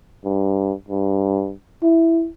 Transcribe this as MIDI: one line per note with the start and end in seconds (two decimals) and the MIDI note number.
0.25 0.73 43
0.89 1.54 43
1.83 2.29 64